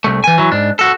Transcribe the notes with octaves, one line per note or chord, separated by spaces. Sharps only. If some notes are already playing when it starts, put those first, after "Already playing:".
C2 A3
E3 G#5
E3 F#3
G#2 D4
F#4 A4